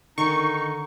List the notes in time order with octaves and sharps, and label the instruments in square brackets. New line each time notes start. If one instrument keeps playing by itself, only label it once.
[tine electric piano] D3 [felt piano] D#3 [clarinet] D#4 [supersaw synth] C#6